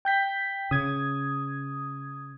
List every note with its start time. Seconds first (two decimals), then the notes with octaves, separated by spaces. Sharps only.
0.05 G5 G6 B6
0.71 C#3 D#6 G#6